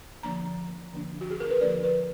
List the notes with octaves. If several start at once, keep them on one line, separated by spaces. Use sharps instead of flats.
D3 F3 A#3 D4 A#5
D3 F3 A#3 D4
F#4
G#4
A#4
B4
D3 F3 A#3 D4 D5
B4